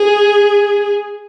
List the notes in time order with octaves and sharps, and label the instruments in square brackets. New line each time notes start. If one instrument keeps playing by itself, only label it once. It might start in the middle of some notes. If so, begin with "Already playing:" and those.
Already playing: [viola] G#4